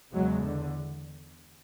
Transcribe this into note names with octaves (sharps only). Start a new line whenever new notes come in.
E2 C#3 F#3 G#3
D3